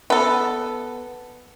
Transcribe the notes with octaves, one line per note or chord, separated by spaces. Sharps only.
B3 A4